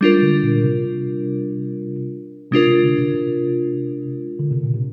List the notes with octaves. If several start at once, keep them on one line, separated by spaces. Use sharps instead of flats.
G3 G#3 D4 F4 A#4
D3
A#2
C3
C3 G#3 D4 F4 A#4
C3
D3
C3
C3
D3
C3
A#2
C3